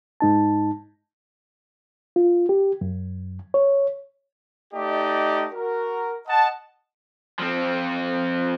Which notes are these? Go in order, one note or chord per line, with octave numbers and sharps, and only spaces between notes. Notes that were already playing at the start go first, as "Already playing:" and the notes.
G#2 D#4 A5
F4
G4
F#2
C#5
A3 D#4 G4 D5 D#5
F#4 A#4
D#5 F#5 A5
F3 C4